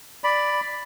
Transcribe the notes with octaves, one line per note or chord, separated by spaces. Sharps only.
D5 B5